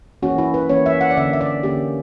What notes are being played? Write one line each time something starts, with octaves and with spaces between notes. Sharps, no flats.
E3 A#3 C#4 F#4
E4
B4
E3 A#3 C#4 C#5
E5
F#5
D5
D3 A#3 C#4 E5
E5
D5
D3 A#3 C#4 G4